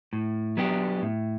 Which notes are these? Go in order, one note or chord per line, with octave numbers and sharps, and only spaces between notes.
A2
F#3 B3 D4 G4
A2